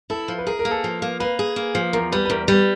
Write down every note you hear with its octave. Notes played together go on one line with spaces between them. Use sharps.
E4 A4
F3
B4
G#4 A#4
A#4
A#3
A4
F3
A#3
A#3 B4
G#4
A#3
F3
E2 A#4
G3 B4
B4
E2 A#4
G3 B4